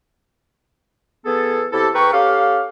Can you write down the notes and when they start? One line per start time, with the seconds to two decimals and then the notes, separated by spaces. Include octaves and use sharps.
1.26 E3 B3 G#4 A4
1.73 C3 E4 G4 A4
1.95 E2 B4 G5 A#5 C#6
2.13 C#4 G4 A4 F5